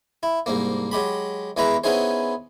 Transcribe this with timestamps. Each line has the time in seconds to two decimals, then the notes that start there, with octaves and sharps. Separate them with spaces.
0.23 E4
0.46 C2 G#2 A#3
0.92 F#3 G#3 G4 B5
1.57 E2 G#3 E4 B4 A#5
1.84 B3 C#4 D#4 E4 G#4 C5